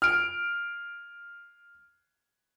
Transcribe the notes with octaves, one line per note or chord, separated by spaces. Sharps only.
F6 D7